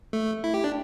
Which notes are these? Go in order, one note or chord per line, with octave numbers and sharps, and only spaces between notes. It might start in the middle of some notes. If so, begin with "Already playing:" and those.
A3
E4
G4
D4